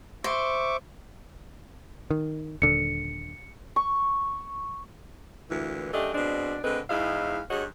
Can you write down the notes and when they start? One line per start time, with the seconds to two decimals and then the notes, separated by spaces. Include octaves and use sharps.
0.24 C5 E5 C#6 D6
2.11 D#3
2.62 D#1 D3 C#7
3.76 C#6
5.50 D2 A#2 E3
5.94 F#2 A3 D4 G4 D#5
6.14 B2 G#3 C4 D4
6.64 D3 G#3 A3 C4 B4
6.90 E2 G#2 E4 D#5 F5
7.50 G2 F#4 G#4 C#5 D#5